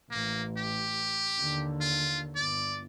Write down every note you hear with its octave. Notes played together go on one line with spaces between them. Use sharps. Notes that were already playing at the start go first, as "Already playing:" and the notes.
A1 A#3
G4
D#2 D3
F4
G1 D5